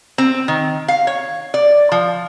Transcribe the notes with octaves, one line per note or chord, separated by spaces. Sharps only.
C4
D#3
F5
C#5
D5
F3